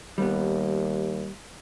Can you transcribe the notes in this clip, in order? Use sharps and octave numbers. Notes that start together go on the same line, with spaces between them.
D#2 G3 B3